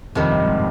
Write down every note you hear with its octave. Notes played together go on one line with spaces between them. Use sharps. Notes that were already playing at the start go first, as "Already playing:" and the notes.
F2 C3 D#3 G3
G2
G#2